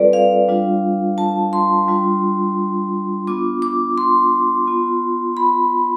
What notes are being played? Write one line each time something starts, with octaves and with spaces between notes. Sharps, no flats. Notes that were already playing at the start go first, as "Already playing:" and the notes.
Already playing: G3 C4 F4 A4 B4 D5
F5
G3 D4 F4
A5
C6
G3 D4 F4
B3 D4 F4 D6
D6
C6
B3 F4
B5